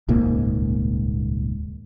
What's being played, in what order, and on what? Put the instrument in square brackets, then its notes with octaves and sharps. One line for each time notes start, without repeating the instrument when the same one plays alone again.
[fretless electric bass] D#1 C#2 G#2 A#3